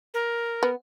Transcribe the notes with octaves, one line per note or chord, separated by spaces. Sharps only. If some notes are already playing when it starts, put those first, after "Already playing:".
A#4
B3